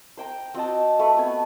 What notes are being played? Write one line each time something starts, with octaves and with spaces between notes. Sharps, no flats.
C5 G5 A#5
C4 F#4 D#5 A5
A3 A4 B4
B3 C4 G#5